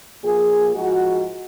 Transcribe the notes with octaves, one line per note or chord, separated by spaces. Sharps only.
A#2 F3 G#4
G#2 F3 F#4